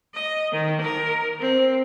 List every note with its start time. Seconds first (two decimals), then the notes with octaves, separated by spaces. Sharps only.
0.14 D#5
0.52 D#3
0.81 A#4
1.40 C4